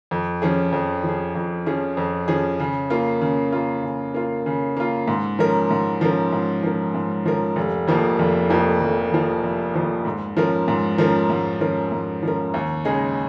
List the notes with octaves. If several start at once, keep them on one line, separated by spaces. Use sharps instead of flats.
F2
F3 C#4 G#4
F2
F3 C#4 G#4
F2
F3 C#4 G#4
F2
F3 C#4 G#4
C#3
A#3 F4
C#3
A#3 F4
C#3
A#3 F4
C#3
A#3 F4
G#2
F3 C#4 A#4
G#2
F3 C#4 A#4
G#2
F3 C#4 A#4
G#2
F3 C#4 A#4
F1
F2 F3 A#3
F1
F2 F3 A#3
F1
F2 F3 A#3
F1
F2 F3 A#3
G#2
F3 C#4 A#4
G#2
F3 C#4 A#4
G#2
F3 C#4 A#4
G#2
F3 C#4 A#4
D#2
C#3 G#3 D#4 G#4